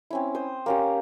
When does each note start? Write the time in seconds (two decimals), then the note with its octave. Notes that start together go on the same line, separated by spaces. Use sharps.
0.10 C4 C#4 E4
0.35 C5 D#6
0.66 A#3 C#4 G4